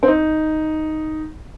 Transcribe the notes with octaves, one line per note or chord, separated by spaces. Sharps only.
C4
D#4